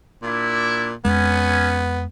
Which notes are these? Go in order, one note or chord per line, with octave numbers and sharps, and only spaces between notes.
A#2 D4 E4
F2 G#3 B3 C#4